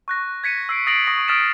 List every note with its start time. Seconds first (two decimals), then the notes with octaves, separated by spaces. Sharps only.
0.08 C#6 F#6 A#6
0.44 G#6 B6 C#7 D#7
0.69 E6 C7 D7
0.87 D#6 A6 A#6 C7 D7 F#7
1.07 C#6 D#6 A#6
1.28 D#6 F6 A6 B6 D7 E7